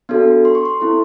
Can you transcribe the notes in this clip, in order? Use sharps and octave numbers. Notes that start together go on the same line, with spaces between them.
B3 D4 F#4 A4
C6
C#6
C6
C4 E4 A4